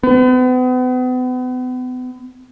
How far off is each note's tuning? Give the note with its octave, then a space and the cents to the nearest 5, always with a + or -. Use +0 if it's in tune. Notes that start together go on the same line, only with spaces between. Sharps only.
B3 +40